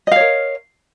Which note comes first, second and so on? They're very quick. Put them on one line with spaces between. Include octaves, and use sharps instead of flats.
D#5 F5 C#5 A#4